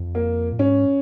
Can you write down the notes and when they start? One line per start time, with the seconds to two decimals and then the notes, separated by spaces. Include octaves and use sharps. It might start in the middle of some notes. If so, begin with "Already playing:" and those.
Already playing: F2
0.15 A#3
0.53 A#2
0.59 G#2 C#4